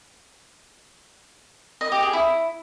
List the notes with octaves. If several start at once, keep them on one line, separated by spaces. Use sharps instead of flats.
D#5
G4
G#4
E4